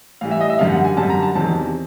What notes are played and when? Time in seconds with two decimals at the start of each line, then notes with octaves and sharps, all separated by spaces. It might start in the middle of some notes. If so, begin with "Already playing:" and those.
0.21 A2 E3 G3 F5
0.31 E5
0.41 D#5
0.50 E5
0.59 F#2 D3 G3 F5
0.72 F#5
0.85 G#5
0.97 F#2 D3 G3 A5
1.10 A#5
1.22 A5
1.35 E2 C3 D#3 F#3 A5